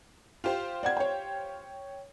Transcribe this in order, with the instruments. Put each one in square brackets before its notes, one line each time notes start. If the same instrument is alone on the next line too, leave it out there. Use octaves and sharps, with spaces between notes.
[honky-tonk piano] F4 G4 C5
[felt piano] D5 F#5 G#6
C#5 G5